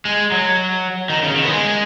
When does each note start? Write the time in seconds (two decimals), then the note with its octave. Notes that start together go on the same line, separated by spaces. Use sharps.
0.05 G#3
0.32 F#3
1.10 D#3
1.23 C#3
1.36 D#3
1.43 B3
1.49 G#3